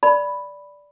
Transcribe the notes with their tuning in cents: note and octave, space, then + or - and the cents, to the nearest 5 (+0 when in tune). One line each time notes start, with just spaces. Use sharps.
D5 -5 B5 +0